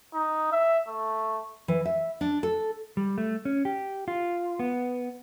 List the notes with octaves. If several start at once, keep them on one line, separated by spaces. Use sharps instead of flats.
D#4
E5
A3
E3
E5
D4
A4
G3
A3
C#4
G4
F4
B3